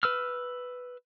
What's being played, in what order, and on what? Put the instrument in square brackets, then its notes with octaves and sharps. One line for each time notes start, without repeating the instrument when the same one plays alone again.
[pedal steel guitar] B4 E6 F6